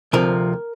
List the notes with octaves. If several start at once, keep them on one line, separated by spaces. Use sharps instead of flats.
D2 C3 F3 A#4